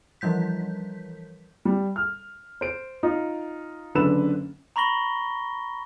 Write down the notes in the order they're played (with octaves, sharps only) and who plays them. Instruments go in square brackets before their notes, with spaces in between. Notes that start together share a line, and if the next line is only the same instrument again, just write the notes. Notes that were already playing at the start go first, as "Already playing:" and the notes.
[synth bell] E3 F3 G3 G6 B6
[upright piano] G3
F6
C5 D7
D#4 F4
F#1 D3 B4 E6 E7
[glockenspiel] A#5 B5 C#6 A#6 G7